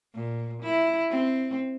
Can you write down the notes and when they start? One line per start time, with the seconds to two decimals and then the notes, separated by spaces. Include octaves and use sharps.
0.15 A#2
0.62 E4
1.10 C4